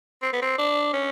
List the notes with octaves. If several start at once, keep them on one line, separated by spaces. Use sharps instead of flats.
C4
B3
C4
D4
C#4